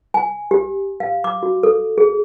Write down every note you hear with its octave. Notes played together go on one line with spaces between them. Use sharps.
G#5
G4
F5
D6
F#4
A4
G#4